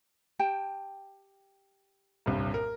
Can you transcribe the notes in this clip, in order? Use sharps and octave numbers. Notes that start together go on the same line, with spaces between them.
G4 G5 A5
D#1 C2 G2
A#4